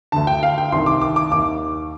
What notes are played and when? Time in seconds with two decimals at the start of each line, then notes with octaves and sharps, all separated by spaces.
0.12 D2 D3 A5
0.27 G5
0.43 F5
0.58 G5
0.72 C2 C3 D#3 C6
0.86 D6
1.02 D6
1.16 D6
1.31 D#2 D#3 D6